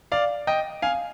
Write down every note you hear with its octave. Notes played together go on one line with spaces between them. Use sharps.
D5 F5
D#5 G5
F5 G#5